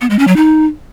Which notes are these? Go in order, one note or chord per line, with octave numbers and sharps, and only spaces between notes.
B3
G#3
C#4
F#3
D#4